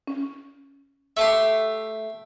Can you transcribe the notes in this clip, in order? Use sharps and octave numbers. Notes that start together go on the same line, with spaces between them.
C#4
A3 G4 E5 A5 C6